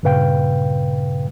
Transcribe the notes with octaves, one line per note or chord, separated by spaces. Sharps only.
G2 A#2 C#3 B4 F5 G5